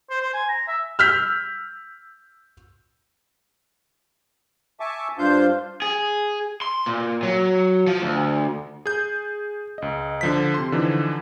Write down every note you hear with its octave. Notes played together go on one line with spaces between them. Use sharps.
C5
C5
G#5
A#5
E5
E6 F6 G6 B6
E5 G#5 A5 C#6 D6
G2 D4 F4 C5 F5 G6
G#4
C6
A#2
F#3
F3
D2
G#4 G6
C#2 D#5
D3 F3 B6
C3 C6
D3 E3 F3 D#4